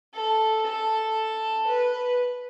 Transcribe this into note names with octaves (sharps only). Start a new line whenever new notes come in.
A4
A4
B4